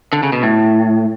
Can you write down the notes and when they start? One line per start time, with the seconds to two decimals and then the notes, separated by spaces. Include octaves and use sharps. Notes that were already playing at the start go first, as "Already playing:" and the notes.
0.13 D3
0.23 C#3
0.32 B2
0.43 A2